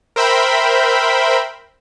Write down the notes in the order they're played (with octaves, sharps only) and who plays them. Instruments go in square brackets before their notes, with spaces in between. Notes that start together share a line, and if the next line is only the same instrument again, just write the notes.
[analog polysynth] A#4 C5 E5 G5 B5